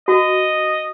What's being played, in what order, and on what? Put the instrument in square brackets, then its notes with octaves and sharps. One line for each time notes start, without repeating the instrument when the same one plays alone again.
[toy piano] F#4 [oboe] D#5